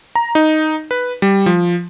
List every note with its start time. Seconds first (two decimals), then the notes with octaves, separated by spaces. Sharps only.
0.15 A#5
0.35 D#4
0.91 B4
1.22 G3
1.46 F3